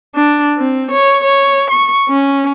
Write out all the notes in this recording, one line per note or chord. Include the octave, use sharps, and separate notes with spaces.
D4
C4
C#5
C#5
C#6
C#4